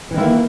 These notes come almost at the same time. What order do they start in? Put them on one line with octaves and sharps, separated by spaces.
E3 D#3 E4 A#3